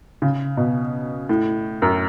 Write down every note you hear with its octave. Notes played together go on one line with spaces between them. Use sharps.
C#3
B2
A2
F#2